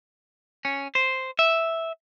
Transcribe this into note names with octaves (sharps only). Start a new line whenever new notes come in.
C#4
C5
E5